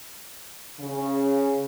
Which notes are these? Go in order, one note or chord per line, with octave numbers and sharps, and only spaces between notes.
C#3